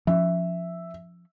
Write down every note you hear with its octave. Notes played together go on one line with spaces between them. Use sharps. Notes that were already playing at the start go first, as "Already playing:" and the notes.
F3 C#4 E5